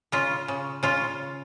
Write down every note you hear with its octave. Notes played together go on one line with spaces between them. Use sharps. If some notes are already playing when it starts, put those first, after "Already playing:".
C#3 F4
C#3
C#3 F4